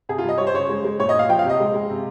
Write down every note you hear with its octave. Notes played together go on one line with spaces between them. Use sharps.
C3 G#4
F4
G3
D#5
G3 C#5
C5
C#3 C#5
G#3
G#3
A#2 C#5
D#5
A#2
F5
F3 G5
F5
C3
D#5
G#3
G#3
C3